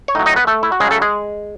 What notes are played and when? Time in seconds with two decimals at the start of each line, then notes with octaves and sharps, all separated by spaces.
0.08 C#5
0.15 A2 D#4 D#5
0.19 F#3
0.26 D#4 D#5
0.36 B3 B4
0.47 A3 A4
0.63 E4
0.72 F#4
0.80 C#3 G#3 G#4
0.84 F#3
0.91 A3 A4
1.02 G#3 G#4